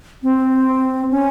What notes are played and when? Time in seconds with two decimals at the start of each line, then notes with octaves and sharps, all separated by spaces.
0.23 C4
1.11 C#4